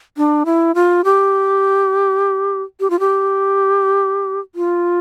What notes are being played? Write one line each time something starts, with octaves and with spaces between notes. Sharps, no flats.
D4
E4
F4
G4
G4
F4
G4
F4